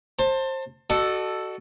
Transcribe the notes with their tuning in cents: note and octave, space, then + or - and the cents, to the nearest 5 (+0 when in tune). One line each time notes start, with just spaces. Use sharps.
C5 +20 A5 +30
F#4 +20 A4 +0 D#5 -40